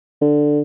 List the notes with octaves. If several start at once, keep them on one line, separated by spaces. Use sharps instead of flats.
D3